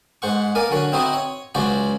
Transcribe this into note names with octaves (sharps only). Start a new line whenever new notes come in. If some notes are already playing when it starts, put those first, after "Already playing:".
G#2 C5 F#5 C#6
A#3 A#4 D5 G#5
D3 F#3 C#5 F#5
C4 D#4 E4 F#4 C5 D#5
C#5
C#2 C#3 F#3 F#4 C5 D5